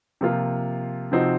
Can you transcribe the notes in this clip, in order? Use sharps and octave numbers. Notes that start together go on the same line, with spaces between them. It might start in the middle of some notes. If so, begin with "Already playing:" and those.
C3 F3 A#3 F4
C3 F3 C4 D#4 F#4